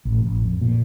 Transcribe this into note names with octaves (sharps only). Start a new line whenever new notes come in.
A1
A1
F2
A#2